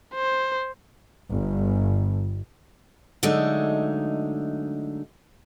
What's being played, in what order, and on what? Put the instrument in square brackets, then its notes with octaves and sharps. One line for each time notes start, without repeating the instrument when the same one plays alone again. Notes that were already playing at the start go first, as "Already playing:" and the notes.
[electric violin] C5
[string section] G1
[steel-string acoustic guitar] D3 F#3 G#3 A3 D#4